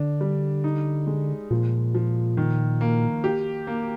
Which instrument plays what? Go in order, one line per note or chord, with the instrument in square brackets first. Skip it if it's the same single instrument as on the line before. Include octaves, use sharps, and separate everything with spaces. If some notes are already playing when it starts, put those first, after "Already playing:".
Already playing: [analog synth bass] D3 [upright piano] D4
[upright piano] G3
D#4
G#3
[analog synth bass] A#2 [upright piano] F3
[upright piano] F3
D#3
A#3
G4
A#3